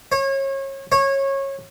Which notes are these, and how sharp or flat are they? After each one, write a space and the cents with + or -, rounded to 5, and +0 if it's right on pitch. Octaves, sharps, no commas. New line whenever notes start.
C#5 -30
C#5 -20